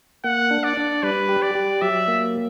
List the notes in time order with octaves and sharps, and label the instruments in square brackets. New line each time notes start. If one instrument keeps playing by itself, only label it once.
[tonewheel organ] A#3 [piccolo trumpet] F#5
[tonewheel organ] D4
[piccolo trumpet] D5
[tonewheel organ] D4
[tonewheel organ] G3 [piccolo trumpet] B4
[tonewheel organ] G4
[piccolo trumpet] D5
[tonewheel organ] G4
[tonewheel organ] F#3 [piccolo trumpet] E5
[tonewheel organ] A#3